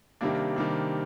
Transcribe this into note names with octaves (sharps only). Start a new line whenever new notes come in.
C3 D#3 G3 A#3 D4
C3 D#3 G3 A#3 D4